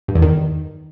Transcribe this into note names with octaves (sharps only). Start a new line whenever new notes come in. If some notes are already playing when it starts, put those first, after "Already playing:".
G2
E2
D#3